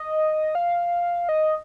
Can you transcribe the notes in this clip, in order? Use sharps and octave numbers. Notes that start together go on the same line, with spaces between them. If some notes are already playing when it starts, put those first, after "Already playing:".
Already playing: D#5
F5
D#5